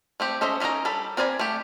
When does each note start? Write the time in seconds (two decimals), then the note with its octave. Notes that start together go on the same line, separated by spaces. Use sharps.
0.20 A3 C4 G4
0.41 C#4 A4 C5 D#5 E5
0.60 E3 C#4 D#4 A#4 A#5
0.85 G3 D4 A4 B5
1.17 C4 A#4 D5 G#5 B5
1.39 A3 G4